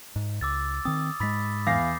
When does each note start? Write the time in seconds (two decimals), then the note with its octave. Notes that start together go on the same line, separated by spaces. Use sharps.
0.16 G#2
0.41 C#2 D6 E6 A6
0.85 D#3 C4 D#6
1.20 G#2 G#3 B5 A6 B6
1.67 E2 F5 D6 G6 A#6 C7